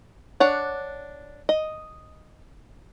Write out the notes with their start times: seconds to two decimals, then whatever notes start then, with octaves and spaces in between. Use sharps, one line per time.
0.40 D4 C#5 F#5
1.49 D#5